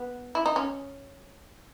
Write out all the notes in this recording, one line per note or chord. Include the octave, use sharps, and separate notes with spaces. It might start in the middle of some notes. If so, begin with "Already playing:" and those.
Already playing: B3
E4
D#4
C#4